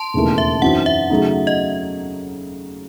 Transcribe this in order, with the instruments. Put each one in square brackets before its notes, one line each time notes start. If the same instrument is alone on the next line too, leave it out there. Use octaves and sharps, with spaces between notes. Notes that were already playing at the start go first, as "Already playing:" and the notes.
Already playing: [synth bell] A5 C6
[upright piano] E1 D#2 C#3 E3 A3
[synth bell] E5
[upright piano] F#2 E3 C4 D#4 F#4 [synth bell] F#5
[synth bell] E5
[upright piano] C#3 F#3 A3 D#4
[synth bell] D#5